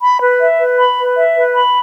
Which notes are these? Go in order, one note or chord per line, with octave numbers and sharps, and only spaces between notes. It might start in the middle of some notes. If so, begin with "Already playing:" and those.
B5
B4
E5
B4
B5
B4
E5
B4
B5